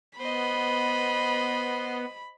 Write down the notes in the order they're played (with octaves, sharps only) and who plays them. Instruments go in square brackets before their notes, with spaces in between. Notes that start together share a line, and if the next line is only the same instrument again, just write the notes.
[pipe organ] B3 [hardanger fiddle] C5 D#5 [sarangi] B5